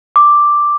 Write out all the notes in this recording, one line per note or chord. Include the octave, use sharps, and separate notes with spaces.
D6